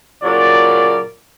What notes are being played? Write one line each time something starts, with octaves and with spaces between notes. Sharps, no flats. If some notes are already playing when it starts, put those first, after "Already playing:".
A#2 C#3 F#3 A#4 D5